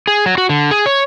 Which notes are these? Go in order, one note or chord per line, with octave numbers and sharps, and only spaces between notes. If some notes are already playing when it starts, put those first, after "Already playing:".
G#4
F#3
F#4
D3
G#4
C#5